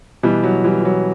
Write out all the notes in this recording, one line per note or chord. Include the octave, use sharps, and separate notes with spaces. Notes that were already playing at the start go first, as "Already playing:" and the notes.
B2 E3 G3
F#3
E3 G3
E3
F#3